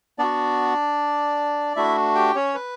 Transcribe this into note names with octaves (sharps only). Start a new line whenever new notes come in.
B3 D4 F#4 D5
A3 D4 E4 F#4 E5
G4 G5
C#4 C#5
B4